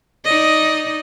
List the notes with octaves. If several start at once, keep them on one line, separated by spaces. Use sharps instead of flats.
D#4 D5 D#5